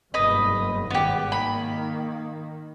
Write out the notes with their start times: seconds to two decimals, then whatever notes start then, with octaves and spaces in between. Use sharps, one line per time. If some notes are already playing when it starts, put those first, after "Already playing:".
0.14 F#1 G2 B2 B4 D#5
0.90 G#1 B3 G4
1.32 D#3 A#3 B5